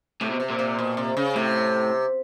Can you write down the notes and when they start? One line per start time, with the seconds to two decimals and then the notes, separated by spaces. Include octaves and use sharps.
0.21 A2 C3
0.31 B2
0.40 C3
0.50 A#2
0.59 C3
0.79 B2
0.97 C3
1.17 C#3
1.36 A2 C3